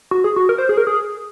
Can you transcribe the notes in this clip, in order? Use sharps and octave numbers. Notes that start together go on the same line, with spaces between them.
F#4
G#4
F#4
A#4
C5
G#4
A#4
G#4